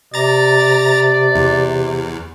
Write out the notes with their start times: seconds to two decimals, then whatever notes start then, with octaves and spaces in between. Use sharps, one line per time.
0.14 C3 D5 A#5 A6
1.35 E2